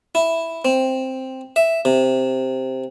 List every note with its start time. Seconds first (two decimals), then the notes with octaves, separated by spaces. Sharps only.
0.15 E4
0.65 C4
1.56 E5
1.85 C3